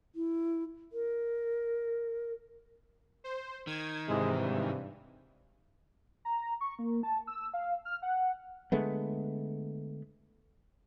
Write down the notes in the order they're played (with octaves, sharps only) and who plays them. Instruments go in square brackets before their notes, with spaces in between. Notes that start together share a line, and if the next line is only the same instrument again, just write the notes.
[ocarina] E4
A#4
[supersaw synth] C5
[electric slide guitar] D#3 [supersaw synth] G#6
[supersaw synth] G#2 E3 [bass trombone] C3 [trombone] G#3
[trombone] G2
[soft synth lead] A#5
C#6
A#3
A5
E6
F5
F6
F#5
[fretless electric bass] D3 G#3 A3 B3